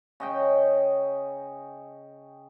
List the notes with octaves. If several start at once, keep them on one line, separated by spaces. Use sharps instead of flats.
C#3 D#5 G5